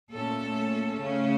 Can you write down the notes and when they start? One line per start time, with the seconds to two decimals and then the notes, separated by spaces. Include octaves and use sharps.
0.13 A#2 A3 C#4 A4
0.98 C#3 A3 C#4